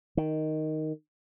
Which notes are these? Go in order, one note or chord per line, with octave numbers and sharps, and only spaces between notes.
D#3